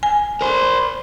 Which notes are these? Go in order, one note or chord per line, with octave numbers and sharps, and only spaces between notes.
G#5
A#4 C5